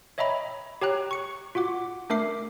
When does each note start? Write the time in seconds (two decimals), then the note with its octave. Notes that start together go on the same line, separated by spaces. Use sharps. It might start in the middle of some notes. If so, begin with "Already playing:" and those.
0.18 C#5 D#5 E5 G5 A#5 B5
0.81 G4 C#5 G5 A#5 F#6
1.11 C#6 C#7
1.55 F4 F#4 F#5 D6
2.10 A3 D4 A#4 E5 D6 C7